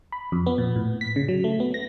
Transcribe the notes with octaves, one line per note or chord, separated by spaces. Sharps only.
B5
F2
B3
A#2
A2
B6
C#3
F#3
A3
B3
A#6